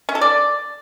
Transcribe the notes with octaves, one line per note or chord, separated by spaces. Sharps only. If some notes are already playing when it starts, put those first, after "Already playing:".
C#4
A4
D5